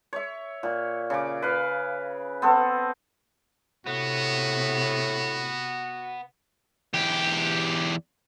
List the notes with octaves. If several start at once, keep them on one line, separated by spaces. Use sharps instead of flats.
C#5 E5
A#2
C#3 D6
B4 F5
B3 C4 A4
A2 C3 B3 F#4
E2 G4